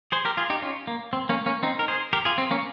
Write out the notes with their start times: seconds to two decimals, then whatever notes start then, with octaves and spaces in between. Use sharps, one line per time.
0.12 G#4 C5
0.25 G4 A#4
0.37 F4 G#4
0.50 D#4 G4
0.62 C#4 F4
0.87 A#3
1.13 C4
1.29 A#3 C#4
1.46 A#3 C#4
1.63 C4 D#4
1.79 A#4
1.88 G#4 C5
2.13 G4 A#4
2.25 F4 G#4
2.38 C4
2.51 A#3 C#4